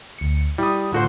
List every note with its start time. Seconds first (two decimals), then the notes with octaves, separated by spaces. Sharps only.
0.18 D2 C#7
0.58 G3 E4 D#6
0.93 A2 D3 F4 F#4 A4 C5